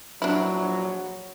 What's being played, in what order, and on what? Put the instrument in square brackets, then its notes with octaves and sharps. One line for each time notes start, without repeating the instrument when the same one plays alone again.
[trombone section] A#1 F3 F#3 [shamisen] D4 E4